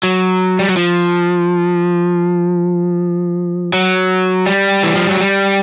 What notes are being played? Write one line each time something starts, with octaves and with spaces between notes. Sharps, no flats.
F#3
G3
F#3
F3
F#3
G3
E3
F3
F#3
G3